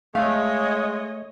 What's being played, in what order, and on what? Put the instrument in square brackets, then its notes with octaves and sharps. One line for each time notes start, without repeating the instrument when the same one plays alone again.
[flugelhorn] G#3 [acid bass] A3 [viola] C#5 D#5 [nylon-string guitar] F5